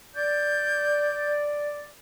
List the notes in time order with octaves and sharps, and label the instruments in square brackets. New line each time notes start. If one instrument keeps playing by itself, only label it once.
[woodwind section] D5 [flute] G6